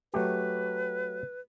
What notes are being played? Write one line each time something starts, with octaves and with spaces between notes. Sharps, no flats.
F#3 A3 G4 B4